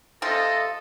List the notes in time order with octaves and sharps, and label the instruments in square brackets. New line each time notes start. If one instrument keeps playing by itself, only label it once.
[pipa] C3 F4 [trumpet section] A4 D#5